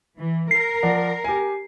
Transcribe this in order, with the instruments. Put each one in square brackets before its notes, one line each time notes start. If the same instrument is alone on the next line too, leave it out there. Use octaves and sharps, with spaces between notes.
[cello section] E3
[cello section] A#4 [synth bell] C7
[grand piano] F3 D5 F#5
G4 G#5